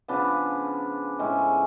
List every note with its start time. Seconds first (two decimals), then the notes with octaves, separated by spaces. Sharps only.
0.08 C#3 F3 B3 D4
1.19 A2 G#3 C#4